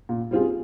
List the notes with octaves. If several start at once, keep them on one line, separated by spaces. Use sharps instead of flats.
A#2
G3 C4 F4 G#4